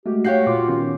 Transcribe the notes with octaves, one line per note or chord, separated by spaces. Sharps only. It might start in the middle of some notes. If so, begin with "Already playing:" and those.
G#3 A3 F#4 G4
A3 F#4 G4 C#5 F5 G6 C7
A#2 F4 D6
D#3 B3 C#4